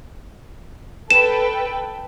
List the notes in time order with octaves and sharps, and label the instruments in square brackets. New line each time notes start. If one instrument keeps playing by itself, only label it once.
[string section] A4 B4 G5 [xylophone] E7